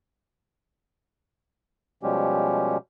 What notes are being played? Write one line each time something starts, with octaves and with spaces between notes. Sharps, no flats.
B2 F3 G3 G#3 C#4 G4